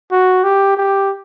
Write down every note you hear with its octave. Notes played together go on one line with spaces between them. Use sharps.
F#4
G4
G4